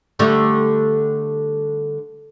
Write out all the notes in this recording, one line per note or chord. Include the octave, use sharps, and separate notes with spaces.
D3 G3 A3